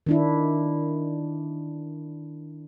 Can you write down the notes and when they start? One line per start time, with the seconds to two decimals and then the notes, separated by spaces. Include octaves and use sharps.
0.07 D#3 D4 E4